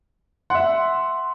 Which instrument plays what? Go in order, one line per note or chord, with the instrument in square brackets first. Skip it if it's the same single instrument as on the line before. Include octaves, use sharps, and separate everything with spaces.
[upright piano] E5 F#5 [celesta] C6 E6